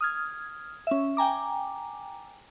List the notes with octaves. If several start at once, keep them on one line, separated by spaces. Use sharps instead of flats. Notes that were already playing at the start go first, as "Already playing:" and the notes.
D#6 F6 G#6
C#4 E5
G5 G#5 A#5 D6